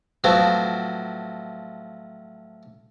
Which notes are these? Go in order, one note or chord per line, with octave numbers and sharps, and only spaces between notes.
A2 F3 F#3 B3 C4 E4